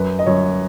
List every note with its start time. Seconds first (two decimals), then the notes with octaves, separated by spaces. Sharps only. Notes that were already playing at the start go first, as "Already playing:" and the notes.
Already playing: F#2 B4
0.19 D#5
0.26 F#2 C#5